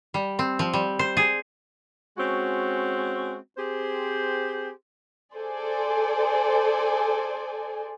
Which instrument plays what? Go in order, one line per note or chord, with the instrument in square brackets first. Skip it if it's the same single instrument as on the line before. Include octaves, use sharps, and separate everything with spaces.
[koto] G3
C4
F3
G3
C5
G#4
[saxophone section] G#3 C4 C#4 F#4
C4 G4 G#4 C5
[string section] G#4 A4 C5 D5 G#5